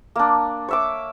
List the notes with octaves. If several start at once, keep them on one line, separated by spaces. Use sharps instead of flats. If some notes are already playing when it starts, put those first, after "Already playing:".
A#3 D4
C#5 E5 D6